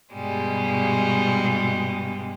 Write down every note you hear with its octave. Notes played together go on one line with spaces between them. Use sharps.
G2 B2 G3 G#3